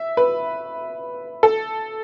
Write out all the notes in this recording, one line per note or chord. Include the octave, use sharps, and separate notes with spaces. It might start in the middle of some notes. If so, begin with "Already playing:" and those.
Already playing: E5
B4
A4